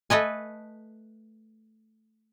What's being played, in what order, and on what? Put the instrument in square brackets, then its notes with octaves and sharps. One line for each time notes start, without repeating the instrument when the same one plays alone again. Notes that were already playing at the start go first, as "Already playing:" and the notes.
[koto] A3 B4 D#5 G#5